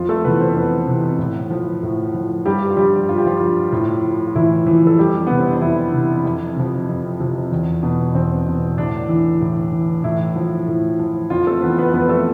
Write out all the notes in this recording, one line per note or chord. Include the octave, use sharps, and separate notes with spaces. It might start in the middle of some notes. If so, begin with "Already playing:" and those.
Already playing: F2 F3 F4
A3 A4
C3 E3 B3 B4
C4 C5
F2 B3 B4
C3 E3
A2
F3
A2
F3
G2 G3 G4
F4
F3 G3 G4
G2 F4
G4
F3 F4
F3
A2
F3
F4
A2 E3 E4
E3 F3 E4
A4
F2 G3 G4
C3 E3 B3
C4
D4
F2 E3 E4
C3 E3
F2
C3 F3
F2
C3 F3
E2
B2
E2 C4
B2
A2 D3 D4
E3
A2
E3
A2 E3 E4
F3
A2
F3
F2 F3 F4
A3 A4
E3 B3 B4
B3 B4
F2 B3 B4
B4
A3 A4